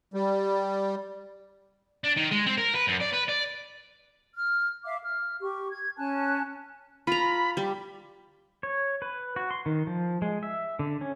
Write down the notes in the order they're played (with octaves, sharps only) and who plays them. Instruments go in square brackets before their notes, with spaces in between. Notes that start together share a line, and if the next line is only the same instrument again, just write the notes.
[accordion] G3
[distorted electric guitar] D4
D#3
G#3
C4
A#4
B4
F#2
D5
B4
D5
[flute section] F6
E5 F5 D6
F6
G4 C#6
G#6
C#4 G#5 A5 F#6
[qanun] F4 A#5 [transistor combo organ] B5
[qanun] G3
[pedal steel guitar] C#5
B4
F#4
C6
D#3
F3
G#3
E5
D3
C#4